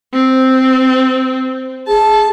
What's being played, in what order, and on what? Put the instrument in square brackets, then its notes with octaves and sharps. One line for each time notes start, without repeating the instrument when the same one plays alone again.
[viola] C4
[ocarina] G#4 [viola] A5